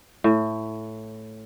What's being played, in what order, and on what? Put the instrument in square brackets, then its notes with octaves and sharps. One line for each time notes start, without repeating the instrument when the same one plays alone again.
[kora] A2